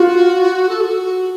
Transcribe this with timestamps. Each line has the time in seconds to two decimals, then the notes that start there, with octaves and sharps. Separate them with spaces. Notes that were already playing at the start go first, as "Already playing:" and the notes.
Already playing: F4 F#4
0.69 A4
0.81 F#4